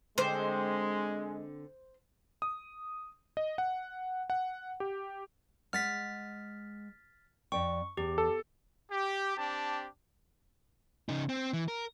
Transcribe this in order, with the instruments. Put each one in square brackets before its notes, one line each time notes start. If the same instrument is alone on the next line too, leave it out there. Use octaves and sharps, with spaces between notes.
[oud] D3 C4 [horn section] G#3 [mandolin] C5
[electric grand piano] D#6
D#5
F#5
F#5
G4
[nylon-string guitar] G#3 F#5 [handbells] F6 A6 B6
[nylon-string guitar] F2 D5 G5 [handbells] C#6
[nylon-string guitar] E2 [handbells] G4
[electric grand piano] A4
[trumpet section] G4
C4 D4 G4 A5
[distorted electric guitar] C#3 D#4
C4
E3
A#4